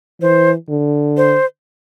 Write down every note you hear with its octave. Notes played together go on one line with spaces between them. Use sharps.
E3 C5
D3
C5